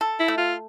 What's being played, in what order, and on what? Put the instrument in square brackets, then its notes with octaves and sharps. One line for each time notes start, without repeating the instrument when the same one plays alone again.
[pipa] A4
[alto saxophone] E4
[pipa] A3
[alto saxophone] F4